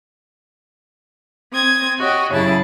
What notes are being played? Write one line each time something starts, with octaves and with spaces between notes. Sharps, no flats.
C4 D#6 G#6
F#4 G4 C#5 D#5
F#2 C#3 E4 G#4 A5